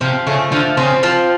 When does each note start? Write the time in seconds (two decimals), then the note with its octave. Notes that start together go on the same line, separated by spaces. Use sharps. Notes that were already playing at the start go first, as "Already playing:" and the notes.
0.01 C3 F3
0.26 C#3 A3
0.52 D3 F3
0.77 C#3 C4
1.03 F3